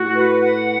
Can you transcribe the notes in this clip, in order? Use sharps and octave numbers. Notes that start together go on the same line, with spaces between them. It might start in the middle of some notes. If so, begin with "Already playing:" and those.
Already playing: A2 F#4
B4
F#5